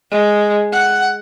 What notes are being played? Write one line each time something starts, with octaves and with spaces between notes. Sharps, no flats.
G#3
F#5